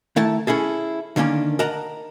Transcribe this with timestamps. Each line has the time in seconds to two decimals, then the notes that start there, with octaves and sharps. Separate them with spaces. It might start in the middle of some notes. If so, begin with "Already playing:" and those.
0.16 D#3 A3 E4 A5
0.47 C#4 E4 G#4 A4
1.16 D3 D#3 A#3 C#4 D4
1.59 A#4 D#5 F#5 A5 A#5